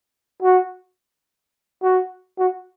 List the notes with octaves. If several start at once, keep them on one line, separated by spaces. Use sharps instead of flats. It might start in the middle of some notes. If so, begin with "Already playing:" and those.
F#4
F#4
F#4